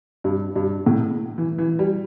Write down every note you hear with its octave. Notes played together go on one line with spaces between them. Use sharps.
G2
G2
A2
E3
E3
G3